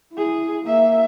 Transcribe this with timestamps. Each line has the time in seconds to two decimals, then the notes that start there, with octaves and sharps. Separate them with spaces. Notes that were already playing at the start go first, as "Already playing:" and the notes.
0.13 E4 G#4
0.64 A#3 E5